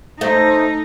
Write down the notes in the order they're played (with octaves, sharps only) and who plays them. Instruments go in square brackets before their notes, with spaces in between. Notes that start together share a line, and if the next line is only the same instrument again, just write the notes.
[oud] A3 [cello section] D#4 [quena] C5